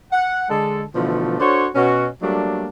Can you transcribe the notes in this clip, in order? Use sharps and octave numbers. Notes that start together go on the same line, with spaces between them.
F#5
D3 G#3 A4
B2 D3 E3 F3 A3 F4
D4 F#4 A4 C5 C#5
B2 C#4 F#4
F#3 G3 A3 A#3 D4